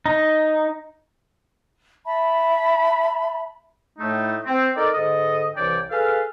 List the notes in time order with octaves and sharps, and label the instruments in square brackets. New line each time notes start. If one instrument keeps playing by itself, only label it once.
[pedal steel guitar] D#4
[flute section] E5 A5 B5
[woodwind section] A2 A3 D#4
C4
D#4 A4 A#4 D5
G#2 D3 A4 D#5
C2 E3 C#5 D5 G5
G#4 A4 B4 F5